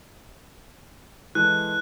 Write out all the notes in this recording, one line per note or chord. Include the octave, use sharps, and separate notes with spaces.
E3 G#3 A4 F#6